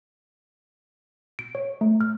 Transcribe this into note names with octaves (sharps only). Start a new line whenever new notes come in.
D7
C#5
A3
F6